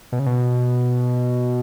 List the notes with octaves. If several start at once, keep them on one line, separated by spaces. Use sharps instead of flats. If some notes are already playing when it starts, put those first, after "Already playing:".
B2
C#3
B2